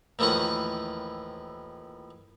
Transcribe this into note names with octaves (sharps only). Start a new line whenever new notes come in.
D#2 A2 E3 F3 F#5 C#6